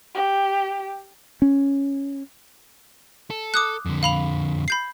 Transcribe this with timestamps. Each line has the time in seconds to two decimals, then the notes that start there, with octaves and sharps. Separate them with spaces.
0.15 G4
1.42 C#4
3.30 A4
3.54 D6 D#6 F#6
3.86 F2 D3
4.03 F5 B5 F7
4.68 B5 G6 C7